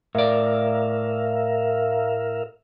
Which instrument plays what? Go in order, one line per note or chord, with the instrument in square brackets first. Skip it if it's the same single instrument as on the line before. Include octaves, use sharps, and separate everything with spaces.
[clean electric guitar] A2 D5 [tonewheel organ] A#4 E5 F5